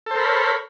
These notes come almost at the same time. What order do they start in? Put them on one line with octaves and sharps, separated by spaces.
A4 C5 A#4 B5 C#5